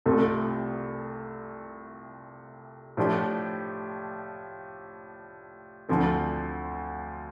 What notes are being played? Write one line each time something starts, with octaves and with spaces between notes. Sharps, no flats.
C2 C3 A3 C4 F4
A2 F3 D4 G4 C5
D2 D3 F3 C4 A4